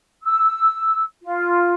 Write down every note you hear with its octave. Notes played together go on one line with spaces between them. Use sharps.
E6
F4